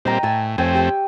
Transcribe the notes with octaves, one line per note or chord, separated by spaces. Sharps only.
A#2 G3 C4 D#5 G5 A#5
A2 G#5 A5 E6
F2 A3 C4 C#5 G5 G#5
G4 G5 C6